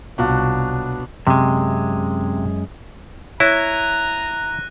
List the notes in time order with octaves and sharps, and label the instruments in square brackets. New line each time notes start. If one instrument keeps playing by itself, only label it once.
[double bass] C2 [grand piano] B2 F4 [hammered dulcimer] F#3 D4
[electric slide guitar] F#2 G#3 [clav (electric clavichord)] C3
[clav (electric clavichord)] E4 [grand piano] C#5 [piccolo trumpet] A#5 [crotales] F#6 A#6 D#7